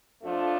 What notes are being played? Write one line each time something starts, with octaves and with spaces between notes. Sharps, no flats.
F2 F3 A3 D4 F4